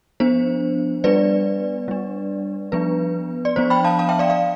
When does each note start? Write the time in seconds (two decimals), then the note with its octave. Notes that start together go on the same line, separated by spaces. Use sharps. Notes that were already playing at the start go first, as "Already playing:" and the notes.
0.20 F3 B3 D4 C5
1.04 G3 B3 D4 B4 D5
1.88 G3 D4
2.72 F3 B3 D4 B4
3.45 D5
3.56 F3 B3 D4 C5
3.70 G5 B5
3.84 F5 A5
3.99 F5 A5
4.09 E5 G5
4.19 D5 F5
4.30 D5 F5